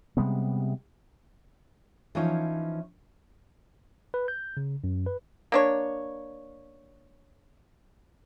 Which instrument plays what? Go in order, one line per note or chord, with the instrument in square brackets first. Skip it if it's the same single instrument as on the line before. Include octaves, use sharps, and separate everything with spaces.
[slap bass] C3 G3 G#3 B3
[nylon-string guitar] E3 F3 C#4 D#4 C#5
[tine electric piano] B4
G6
C#3
F#2
B4
[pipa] A#3 D4 C#5